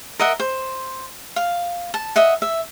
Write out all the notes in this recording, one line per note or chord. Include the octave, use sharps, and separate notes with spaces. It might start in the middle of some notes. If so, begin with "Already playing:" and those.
A#4 D#5 E5 F#5
C5
F5
A5
D#5 E5 F#5
E5